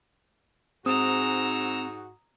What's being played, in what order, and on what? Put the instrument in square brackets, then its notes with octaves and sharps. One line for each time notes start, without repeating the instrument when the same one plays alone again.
[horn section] G#2 F#4 [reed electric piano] C4 [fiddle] A#5 E6 [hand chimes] D#6